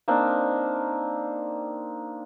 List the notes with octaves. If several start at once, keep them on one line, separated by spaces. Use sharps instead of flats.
A#3 C4 D4 D#4